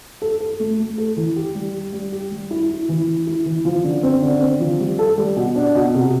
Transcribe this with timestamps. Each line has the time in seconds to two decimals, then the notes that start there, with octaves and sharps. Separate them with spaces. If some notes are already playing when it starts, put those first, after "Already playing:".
0.22 A4
0.40 A4
0.60 A3
0.79 A3
0.98 A4
1.17 E3
1.36 G4
1.55 G3
1.74 G4
1.93 G3
2.12 G4
2.31 G3
2.51 E4
2.70 E4
2.89 E3
3.07 E3
3.27 E4
3.46 E3
3.65 F3
3.84 D3
4.03 C4
4.22 D3
4.41 C4
4.60 F3
4.80 G3
4.99 A4
5.18 G3
5.37 B2
5.56 D4
5.75 B2
5.94 C3